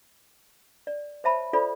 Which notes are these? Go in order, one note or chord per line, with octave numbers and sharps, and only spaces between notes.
D5
C5 C#5 E5 A5 B5
F4 A4 C5 D5 B5